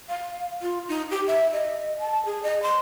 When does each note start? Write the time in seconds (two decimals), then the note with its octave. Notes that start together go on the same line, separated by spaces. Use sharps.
0.09 F5
0.62 F4
0.88 D#4
1.11 G4
1.27 E5
1.53 D#5
1.99 A5
2.25 G#4
2.43 D#5
2.63 C6